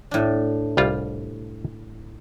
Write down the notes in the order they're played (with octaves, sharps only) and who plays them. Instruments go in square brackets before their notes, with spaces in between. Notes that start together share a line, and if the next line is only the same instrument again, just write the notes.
[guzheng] A2 D4
[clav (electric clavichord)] C2 G3 F4